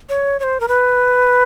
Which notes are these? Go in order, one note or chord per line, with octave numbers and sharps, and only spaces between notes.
C#5
C#5
C5
A#4
B4